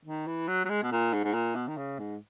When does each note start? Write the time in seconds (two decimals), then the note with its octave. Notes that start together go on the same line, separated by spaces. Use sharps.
0.05 D#3
0.27 E3
0.48 F#3
0.65 F#3
0.69 G#3
0.83 B2
0.92 A#2
1.13 G#2
1.24 G#2
1.34 A#2
1.55 B2
1.68 D#3
1.77 C#3
1.99 G#2